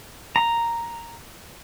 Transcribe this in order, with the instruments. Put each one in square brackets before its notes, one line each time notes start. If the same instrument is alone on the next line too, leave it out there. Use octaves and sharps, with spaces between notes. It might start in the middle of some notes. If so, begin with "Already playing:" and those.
[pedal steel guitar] A#5